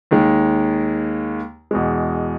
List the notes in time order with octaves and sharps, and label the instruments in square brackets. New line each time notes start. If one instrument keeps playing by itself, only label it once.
[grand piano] D#2 D#3 G#3
E2 B2 G#3